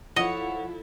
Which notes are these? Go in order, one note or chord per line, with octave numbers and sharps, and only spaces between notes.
F3 E4 A4 C#5 D#5 F#5